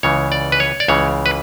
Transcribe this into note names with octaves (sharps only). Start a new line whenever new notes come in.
C#2 C#3 E3 C#5
D5
B4
C#5
D5
C#2 C#3 E3 C#5
B4